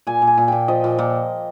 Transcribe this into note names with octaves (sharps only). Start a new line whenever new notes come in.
A#2 G#5
A#2
G#5
A#2
A#2 G5
F3 D#5
A#2
A#2